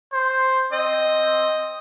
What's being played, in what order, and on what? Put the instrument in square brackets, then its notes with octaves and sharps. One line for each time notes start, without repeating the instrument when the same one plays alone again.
[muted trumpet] C5
[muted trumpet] C4 [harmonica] D#5